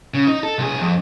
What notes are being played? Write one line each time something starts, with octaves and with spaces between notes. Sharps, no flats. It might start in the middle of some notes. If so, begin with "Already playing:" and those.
C#3
D#4
A4
C2 G#4
F2